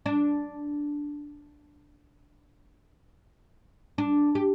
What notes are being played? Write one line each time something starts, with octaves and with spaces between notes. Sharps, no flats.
D4
D4
G4